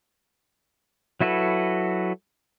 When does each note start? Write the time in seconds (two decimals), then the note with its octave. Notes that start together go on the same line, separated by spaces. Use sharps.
1.21 F#3 E4 F#4 A4 B4